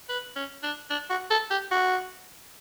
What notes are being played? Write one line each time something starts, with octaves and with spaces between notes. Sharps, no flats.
B4
C#4
D4
D4
F#4
A4
G4
F#4